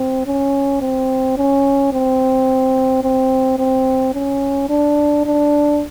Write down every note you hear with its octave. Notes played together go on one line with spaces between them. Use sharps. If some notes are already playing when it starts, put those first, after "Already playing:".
Already playing: C4
C#4
C4
C#4
C4
C4
C4
C#4
D4
D4